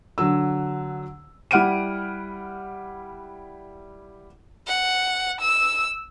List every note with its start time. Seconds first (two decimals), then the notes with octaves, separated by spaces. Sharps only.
0.18 D3 F#3 E6
1.51 G3 E4 F#5 F6 D7 D#7
4.67 F#5
5.41 E6